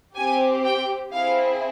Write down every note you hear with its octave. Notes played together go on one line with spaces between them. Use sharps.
C4 G4 G#5
G5
C4 E4 G#4 F5